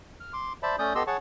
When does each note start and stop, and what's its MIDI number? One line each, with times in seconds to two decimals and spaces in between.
0.20 0.33 89
0.33 0.53 84
0.33 0.53 86
0.63 0.76 72
0.63 0.76 74
0.63 0.76 76
0.63 0.76 81
0.63 0.76 83
0.79 0.93 57
0.79 0.93 61
0.79 0.93 74
0.79 0.93 87
0.79 0.93 91
0.95 1.03 59
0.95 1.03 67
0.95 1.03 69
0.95 1.03 75
0.95 1.03 84
0.95 1.03 88
1.07 1.17 68
1.07 1.17 73
1.07 1.17 78
1.07 1.17 81
1.07 1.17 85